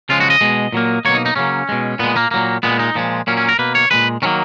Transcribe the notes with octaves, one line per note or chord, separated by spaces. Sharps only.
C#3 F3 G#3 F4
F#4
D#5
B2 G#3
A#2 F#3 A#3
B2 F#3 A#3 C#5
D#4
D#4
C#3 F#3 A#3 C#4
B2 G#3
A#2 G#3 B3
A#3
A#2 F#3 A#3
A#2 G#3 B3
D#4
A#2 F3 G#3
A#2 F#3 A#3 C#4
C#4
A#4
B2 A#3 B4
C#5
A#2 G#3 B4
D#3 F#3 A#3 C#4